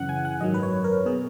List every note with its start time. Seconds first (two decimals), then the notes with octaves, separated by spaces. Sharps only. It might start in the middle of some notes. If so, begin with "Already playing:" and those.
Already playing: F#2 C#3 E3 F#5
0.09 G#5
0.25 F#5
0.41 G#1 F#2 D#3 F#3 D#5
0.54 B4
0.63 C#5
0.84 A#4
1.05 B2 F#3 G#4